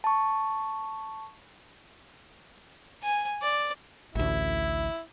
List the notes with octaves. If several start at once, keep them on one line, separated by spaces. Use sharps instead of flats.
A5 C#6
G#5
D5
A1 D2 E4